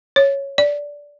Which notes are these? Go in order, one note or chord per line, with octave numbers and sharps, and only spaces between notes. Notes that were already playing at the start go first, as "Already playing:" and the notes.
C#5
D5